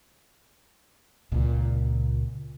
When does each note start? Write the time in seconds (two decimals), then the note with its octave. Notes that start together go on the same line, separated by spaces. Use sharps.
1.32 C#2 A#2